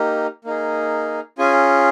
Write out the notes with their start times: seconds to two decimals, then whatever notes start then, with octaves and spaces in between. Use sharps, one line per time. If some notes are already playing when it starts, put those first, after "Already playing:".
Already playing: A#3 D#4 G4
0.45 A#3 D#4 G#4
1.38 C#4 F4 G#4 G#5